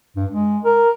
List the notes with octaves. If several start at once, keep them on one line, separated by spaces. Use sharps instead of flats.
G2
G#3
A#4